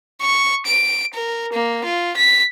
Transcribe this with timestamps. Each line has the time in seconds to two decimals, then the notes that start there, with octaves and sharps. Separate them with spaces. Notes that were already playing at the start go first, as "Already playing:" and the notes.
0.22 C#6
0.66 D7
1.14 A#4
1.53 A#3
1.85 F4
2.17 B6